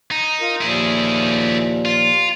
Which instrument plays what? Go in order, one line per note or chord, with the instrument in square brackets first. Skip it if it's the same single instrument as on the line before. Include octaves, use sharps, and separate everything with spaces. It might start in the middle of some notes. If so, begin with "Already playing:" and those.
[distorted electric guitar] D#4
[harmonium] F4 A#4
[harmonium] D#2 A#2 F3 [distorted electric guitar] E4 G#4
[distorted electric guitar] F4